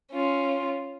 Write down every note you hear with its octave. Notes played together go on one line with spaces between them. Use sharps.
C#4 F4